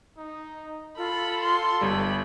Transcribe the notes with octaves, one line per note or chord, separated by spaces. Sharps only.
D#4
F4 A4 B5
C6
G1 G3 B5